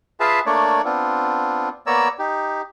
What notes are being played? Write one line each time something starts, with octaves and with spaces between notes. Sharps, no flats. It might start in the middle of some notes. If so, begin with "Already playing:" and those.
F4 G#4 B4 E5 F5 A5
A3 A#3 D4 C#5 D5
B3 C4 D4 F4
A#3 B3 C#5 D5 A#5 E6
D#4 G4